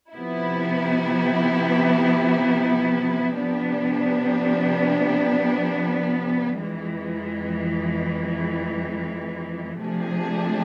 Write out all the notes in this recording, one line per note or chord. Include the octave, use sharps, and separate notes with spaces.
C3 F3 B3 E4
C3 F3 B3 D4
F2 E3 G#3
C3 F3 A3 D4 G#4